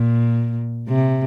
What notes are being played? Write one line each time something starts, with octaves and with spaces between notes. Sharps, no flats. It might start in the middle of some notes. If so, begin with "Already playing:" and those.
Already playing: A#2
C3